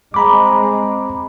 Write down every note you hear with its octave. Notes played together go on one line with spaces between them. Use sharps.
G#3 C4 A#5 B5 D6